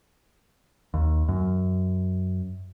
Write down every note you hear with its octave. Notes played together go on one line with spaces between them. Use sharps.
D#2
F#2